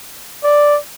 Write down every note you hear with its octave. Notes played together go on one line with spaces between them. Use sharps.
D5